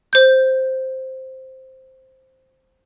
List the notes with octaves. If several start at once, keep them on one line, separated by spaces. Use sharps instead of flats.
C5 G6